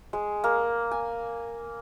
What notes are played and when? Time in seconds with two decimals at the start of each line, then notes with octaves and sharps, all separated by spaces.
0.13 G#3
0.44 A#3
0.91 G#5